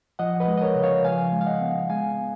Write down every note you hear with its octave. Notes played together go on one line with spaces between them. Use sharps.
F3 D#5 F#5
B4 D#5
G#3
D#5
A#4 C#5
C#3
C#5 F5
F3 F5 G#5
G#3
F5
D#5 F#5
B3
G#3 F5 G#5
B3